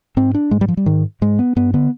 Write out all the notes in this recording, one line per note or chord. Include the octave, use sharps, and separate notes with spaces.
G#2 C4
D4
G#2 G#3
G3
F3
G3
G#2 D#3
G#2 G#3
B3
G2 B3
D3 B3